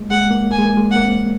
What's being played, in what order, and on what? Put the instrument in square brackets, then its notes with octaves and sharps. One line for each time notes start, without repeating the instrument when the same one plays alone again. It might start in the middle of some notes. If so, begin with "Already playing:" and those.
Already playing: [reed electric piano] G#3 A#3
[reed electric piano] G#3 [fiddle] F#5
[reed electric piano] A#3
[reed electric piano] A#3 [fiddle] G#5
[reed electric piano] G#3
A#3
G#3
[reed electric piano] A#3 [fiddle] F#5
[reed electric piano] C4